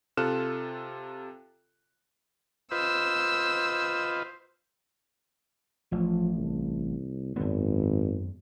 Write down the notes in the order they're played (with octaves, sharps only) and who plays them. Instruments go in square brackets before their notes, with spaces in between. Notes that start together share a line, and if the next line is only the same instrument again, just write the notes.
[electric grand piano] C3 F4 A4 F6 F#6 E7
[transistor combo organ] F4 B4 D#5 [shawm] C5 [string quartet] E6
[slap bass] A1 [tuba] F3
[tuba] C2
[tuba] G#1 [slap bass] F#2 B3